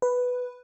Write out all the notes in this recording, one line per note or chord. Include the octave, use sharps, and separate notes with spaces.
B4